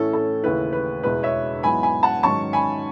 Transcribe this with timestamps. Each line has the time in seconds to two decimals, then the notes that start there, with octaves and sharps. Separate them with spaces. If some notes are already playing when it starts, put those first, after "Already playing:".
Already playing: A2 E3 A3 C#4 E4 A4
0.14 A4
0.43 D#2 C#3 E3 A3 E4 B4
0.73 B4
1.03 E2 B2 G#3 B3 E4 B4
1.23 C#5 E5
1.63 G#2 F#3 B3 E4 G#5 B5
1.83 G#5 B5
2.03 F#5 A5
2.23 G#2 D#3 F#3 C#4 A5 C#6
2.53 G#5 B5